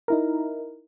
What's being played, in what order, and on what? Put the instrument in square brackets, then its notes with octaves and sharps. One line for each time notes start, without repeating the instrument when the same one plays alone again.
[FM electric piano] D#4 E4 A#4